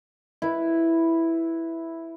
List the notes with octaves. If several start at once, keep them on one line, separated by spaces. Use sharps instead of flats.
E4 B4